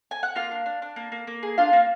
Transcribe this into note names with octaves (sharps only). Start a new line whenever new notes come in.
G#5
F#5
A#3 F4 F5
D4
D4
D4
A#3
A#3
A#3
G#4
D4 F4 F5
A#3